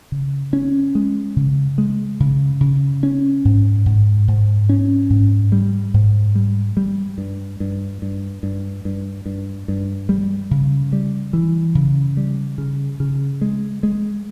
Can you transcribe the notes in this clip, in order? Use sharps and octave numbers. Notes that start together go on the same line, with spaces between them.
C#3
C#4
G#3
C#3
G#3
C#3
C#3
C#4
G#2
G#2
G#2
C#4
G#2
G3
G#2
G3
G3
G2
G2
G2
G2
G2
G2
G2
G3
C#3
G3
E3
C#3
G3
C#3
C#3
G#3
G#3